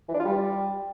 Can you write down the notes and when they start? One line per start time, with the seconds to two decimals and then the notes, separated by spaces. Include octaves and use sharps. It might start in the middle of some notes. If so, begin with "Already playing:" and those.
0.09 E3
0.14 D4
0.20 F4
0.25 G3